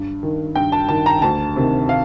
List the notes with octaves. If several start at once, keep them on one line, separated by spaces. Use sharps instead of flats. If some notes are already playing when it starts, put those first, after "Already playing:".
Already playing: G2
D#3
G2 G5
A5
D#3 A5
A#5
D2 A5
C3 D#3
F5